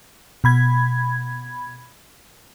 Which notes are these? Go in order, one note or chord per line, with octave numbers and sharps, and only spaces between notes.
B2 B5 G#6